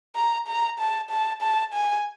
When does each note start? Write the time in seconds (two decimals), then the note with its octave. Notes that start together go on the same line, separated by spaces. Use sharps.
0.16 A#5
0.48 A#5
0.79 A5
1.10 A5
1.42 A5
1.73 G#5